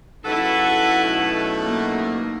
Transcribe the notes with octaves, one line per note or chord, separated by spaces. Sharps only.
C#3 F#3 D#4 E4 F#4 A4 B4
B2 A3
A#3